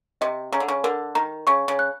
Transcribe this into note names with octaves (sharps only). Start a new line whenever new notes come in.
C3 D#5
C#3 A#5
D3
C#3
D3 A#4
D#3 A#5
C#3 C#6
C#3
F#6